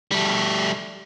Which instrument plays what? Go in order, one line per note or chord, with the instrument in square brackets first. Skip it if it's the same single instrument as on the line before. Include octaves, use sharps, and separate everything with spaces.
[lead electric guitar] G3 A3